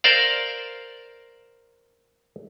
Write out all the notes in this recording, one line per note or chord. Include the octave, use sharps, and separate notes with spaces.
A#4 C5 D5 F5